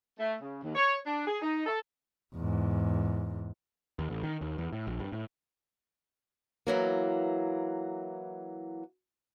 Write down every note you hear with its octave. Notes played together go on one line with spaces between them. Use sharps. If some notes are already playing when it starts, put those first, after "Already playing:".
A3
C#3
D#2
C#5
D4
G#4
D#4
A4
E2 G#2
D#2
A1
D#3
D#2
E2
A2
A#1
G2
A2
E3 F#3 A#3